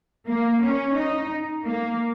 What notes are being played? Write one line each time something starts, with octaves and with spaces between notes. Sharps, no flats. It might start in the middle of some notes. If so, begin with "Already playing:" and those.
A#3
C#4
D#4
A#3